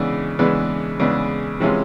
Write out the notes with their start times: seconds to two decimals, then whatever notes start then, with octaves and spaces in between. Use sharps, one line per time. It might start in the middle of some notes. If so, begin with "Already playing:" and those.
Already playing: C#3 E3 G#3 B3 D4
0.39 C#3 E3 G#3 B3 D4
0.99 C#3 E3 G#3 B3 D4
1.60 C3 E3 G#3 C#4 F4